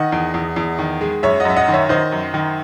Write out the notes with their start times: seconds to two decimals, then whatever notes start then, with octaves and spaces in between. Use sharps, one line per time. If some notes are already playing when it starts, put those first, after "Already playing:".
Already playing: D#3 D#5 F#5
0.12 E2
0.34 E2
0.56 E2
0.79 D#3
1.01 G#3
1.23 F#2 C#5 E5
1.40 F#2 D#5 F#5
1.50 E5
1.56 D#5 F#5
1.68 D#3
1.73 C#5 E5
1.89 D#3 C5 D#5
2.12 F#2
2.34 D#3